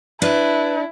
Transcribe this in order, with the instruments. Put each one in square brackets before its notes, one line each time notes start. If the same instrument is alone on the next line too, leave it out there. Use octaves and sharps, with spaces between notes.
[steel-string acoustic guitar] D4 [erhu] E4 [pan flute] B4